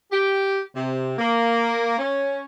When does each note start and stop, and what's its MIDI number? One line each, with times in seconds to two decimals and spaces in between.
0.12 0.61 67
0.75 1.17 48
1.18 1.96 58
1.99 2.43 61